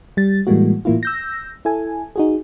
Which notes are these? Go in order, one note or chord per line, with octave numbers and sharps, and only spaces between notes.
G3 A6
A2 E3 G3 G#3 A#3 F#4
A2 E3 A#3 E4 F4
E6 G6 A#6
E4 A4 G#5
D#4 F#4 G#4